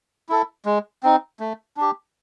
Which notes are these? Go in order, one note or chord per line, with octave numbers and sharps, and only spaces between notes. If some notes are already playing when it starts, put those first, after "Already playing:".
E4 A4
G#3
C4 D#4
A3
D4 G4